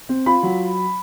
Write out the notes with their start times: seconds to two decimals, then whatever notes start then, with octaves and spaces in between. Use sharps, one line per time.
0.09 C4
0.26 F4 B5
0.43 F#3